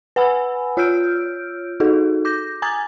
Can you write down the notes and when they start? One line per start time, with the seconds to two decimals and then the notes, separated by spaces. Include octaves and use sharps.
0.16 B4 F#5 G#5 B5 E6
0.77 F4 C#5 E6 F6 G6 D7
1.80 D#4 F#4 G#4 A4
2.25 D6 G6 A#6
2.62 G#5 A#5 D6 D#6 G#6 A6